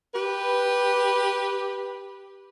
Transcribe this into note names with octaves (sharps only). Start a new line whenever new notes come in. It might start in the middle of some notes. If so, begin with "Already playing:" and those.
G4 B4